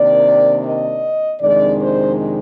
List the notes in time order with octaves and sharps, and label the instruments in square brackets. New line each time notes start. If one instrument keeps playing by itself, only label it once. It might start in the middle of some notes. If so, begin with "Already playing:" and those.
Already playing: [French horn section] C3 D#3 A#3 D4 D5
D#5
F2 C3 D#3 G#3 D4 D5
C5